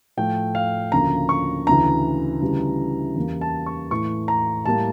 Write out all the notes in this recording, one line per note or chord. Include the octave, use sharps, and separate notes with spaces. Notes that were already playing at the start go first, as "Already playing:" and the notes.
A2 F3 A3 G5
F5
D2 C#3 F3 A#3 A#5
C#6
D2 C#3 E3 A#5
D2 C#3 E3 G3
E2 C#3 G3 A#3
A5
C#6
A2 E3 A3 C#6
A#5
A2 G3 A#3 A5